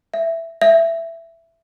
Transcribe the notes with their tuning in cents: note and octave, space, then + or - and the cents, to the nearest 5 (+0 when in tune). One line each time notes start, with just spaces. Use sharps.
E5 +5
E5 +10